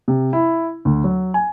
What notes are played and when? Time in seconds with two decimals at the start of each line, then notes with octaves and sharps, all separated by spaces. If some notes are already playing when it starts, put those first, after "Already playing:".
0.08 C3
0.33 E4
0.85 D2
1.04 F#3
1.34 G#5